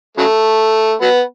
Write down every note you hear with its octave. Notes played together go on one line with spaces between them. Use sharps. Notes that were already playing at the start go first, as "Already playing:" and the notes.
C#3 F#3 A3
F#3 B3